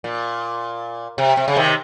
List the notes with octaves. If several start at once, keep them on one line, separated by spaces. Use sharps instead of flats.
A#2
C3
C3
C#3
C3 D#3